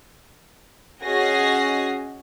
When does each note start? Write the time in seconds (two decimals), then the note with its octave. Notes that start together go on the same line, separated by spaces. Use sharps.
1.03 C#4 F#4 G#4 D#5 A#6 C7